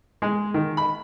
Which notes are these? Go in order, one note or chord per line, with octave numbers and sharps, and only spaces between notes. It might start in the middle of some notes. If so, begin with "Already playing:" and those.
G#3
D#3
B5